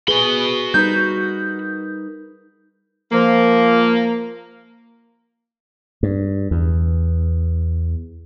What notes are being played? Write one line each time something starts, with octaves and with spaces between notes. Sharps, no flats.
F#4 G#4 B4 B5 G7
G3 D#4 A#4 B4 G6
F3 A#3
G2
E2